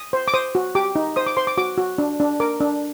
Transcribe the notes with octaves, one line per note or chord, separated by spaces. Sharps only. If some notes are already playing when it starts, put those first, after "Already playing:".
Already playing: D#6
C5
D6
C5 D#6
F#4
G4 D6
D#4
C5 D#6
D6
C5 C6
D6
F#4 D6
F#4
D4
D4
A#4 D6
D4